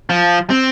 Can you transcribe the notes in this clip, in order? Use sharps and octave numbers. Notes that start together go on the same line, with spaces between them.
F3
C4